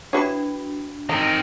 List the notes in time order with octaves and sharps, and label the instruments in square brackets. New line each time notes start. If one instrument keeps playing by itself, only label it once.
[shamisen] E3 B4 C#5 [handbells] D4 F#4 B5
[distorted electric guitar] D#3 C4 [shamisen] D#4